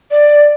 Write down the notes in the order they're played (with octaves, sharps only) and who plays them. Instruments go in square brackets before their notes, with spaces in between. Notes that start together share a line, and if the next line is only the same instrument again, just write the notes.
[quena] D5